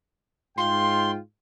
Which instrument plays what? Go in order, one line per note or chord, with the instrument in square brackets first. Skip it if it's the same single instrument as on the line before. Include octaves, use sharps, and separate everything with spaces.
[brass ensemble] G#2 F4 G5 [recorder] C6